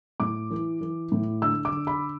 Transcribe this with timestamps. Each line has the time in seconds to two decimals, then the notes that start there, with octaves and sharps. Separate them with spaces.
0.20 A2 D6
0.51 E3
0.81 E3
1.12 A2
1.41 D3 E6
1.65 D6
1.72 D3
1.87 B5